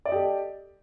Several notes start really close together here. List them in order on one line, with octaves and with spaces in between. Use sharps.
D5 D#5 G4 A4